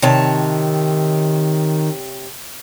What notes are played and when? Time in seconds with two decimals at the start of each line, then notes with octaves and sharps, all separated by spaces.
0.02 C3 D#3 C#5 A5